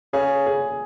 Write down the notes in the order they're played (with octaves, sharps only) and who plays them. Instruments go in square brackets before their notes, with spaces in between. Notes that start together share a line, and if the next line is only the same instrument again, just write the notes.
[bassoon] C#3 [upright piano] G#4
[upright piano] G#4